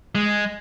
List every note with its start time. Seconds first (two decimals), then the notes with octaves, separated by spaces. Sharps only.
0.15 G#3